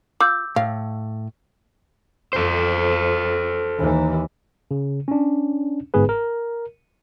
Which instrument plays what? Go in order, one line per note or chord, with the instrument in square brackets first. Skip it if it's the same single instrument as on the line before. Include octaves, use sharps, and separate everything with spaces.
[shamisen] F4 [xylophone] D6 E6 G6
[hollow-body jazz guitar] A2 [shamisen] F5
[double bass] F2 [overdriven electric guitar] A4 C5
[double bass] D#2 E3
[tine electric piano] C#3
C#4 D4
G1 G#2 B3 G#4 B4
A#4